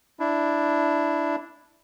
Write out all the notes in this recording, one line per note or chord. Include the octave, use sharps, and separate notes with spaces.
D4 E4